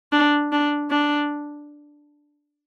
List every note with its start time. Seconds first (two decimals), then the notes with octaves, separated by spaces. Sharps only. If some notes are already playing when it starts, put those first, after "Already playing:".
0.12 D4
0.52 D4
0.90 D4